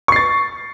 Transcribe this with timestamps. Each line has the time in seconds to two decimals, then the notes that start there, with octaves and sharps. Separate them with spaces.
0.08 C#6
0.12 C7
0.16 A6